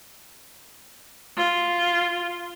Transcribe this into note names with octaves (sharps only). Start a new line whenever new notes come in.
F4